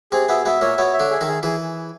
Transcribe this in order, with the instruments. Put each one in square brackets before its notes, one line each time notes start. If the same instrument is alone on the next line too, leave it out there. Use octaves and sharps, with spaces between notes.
[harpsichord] C3 C4 [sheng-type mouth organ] G#4
[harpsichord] B2 B3 [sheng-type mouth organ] E5
[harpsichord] B2 B3 [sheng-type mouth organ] E5
[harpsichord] A#2 A#3 [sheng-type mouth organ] C#5
[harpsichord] B2 B3 [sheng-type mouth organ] C#5
[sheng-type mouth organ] E5
[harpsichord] D3 D4
[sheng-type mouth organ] G#4
[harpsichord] D#3 D#4
[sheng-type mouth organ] G#4
[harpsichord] E3 E4 [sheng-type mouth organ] G#4